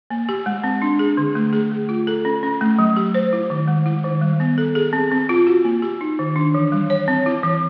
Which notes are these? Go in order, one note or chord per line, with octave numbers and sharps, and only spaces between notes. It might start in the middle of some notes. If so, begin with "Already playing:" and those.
A#3
G4
G#3
C4
D4
G#4
D3
A3
G#4
A3
F4
A4
C#4
C#4
A3
F#3
G4
C5
E4
D#3
G#3
E4
D#3
G3
B3
A4
G#4
C4
C4
F4
F#4
A#3
G4
D#4
D#3
D4
E3
G3
C#5
C4
E4
E3